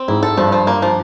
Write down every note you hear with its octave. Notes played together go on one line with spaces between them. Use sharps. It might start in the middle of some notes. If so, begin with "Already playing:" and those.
Already playing: C4
G#2 E4
A4
G2 F3
F3
A#3
F3